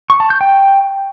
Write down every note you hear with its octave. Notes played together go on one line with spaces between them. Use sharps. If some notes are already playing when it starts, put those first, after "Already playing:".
C#6
A5
G6
G5